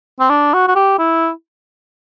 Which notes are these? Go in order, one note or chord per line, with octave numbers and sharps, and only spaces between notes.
C4
D4
F#4
F#4
G4
E4